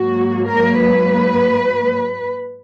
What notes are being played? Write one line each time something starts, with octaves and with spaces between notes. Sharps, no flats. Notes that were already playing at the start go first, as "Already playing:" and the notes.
Already playing: G#2 F#3 A#3 F#4
A#4
B4